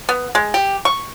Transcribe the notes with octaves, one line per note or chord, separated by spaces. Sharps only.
B3
G#3
G4
C#6